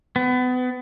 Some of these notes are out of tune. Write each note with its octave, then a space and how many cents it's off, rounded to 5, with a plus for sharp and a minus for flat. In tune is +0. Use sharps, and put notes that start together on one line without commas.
B3 +30